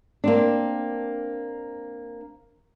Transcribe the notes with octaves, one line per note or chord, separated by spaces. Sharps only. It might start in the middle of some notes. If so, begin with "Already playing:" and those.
A#3 C4 D4